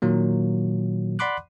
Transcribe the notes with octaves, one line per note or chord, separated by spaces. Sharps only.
A#2 D#3 F#3 A#3
D5 F#5 B5 C6 D6 F#6